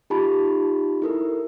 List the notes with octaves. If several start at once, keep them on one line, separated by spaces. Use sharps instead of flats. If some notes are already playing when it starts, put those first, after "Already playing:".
D#4 F4 G4 A5 B5
E4 A4 A#4